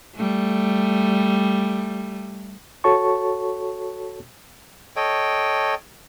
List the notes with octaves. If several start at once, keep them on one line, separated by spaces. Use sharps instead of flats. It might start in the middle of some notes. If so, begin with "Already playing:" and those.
G3 A3
F#4 A4 C#5 A5 C#6
A4 C#5 D#5 G5